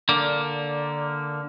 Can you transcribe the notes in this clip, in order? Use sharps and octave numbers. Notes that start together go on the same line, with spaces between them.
D3 A#3 D5